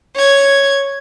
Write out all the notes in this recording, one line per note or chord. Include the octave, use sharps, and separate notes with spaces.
C#5 G#6